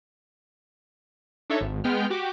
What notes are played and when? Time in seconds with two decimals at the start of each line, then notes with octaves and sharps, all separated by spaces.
1.50 D4 D#4 A4 C#5 E5
1.61 G#1
1.84 G#3 B3 G5 F6
2.10 F#4 G4 D6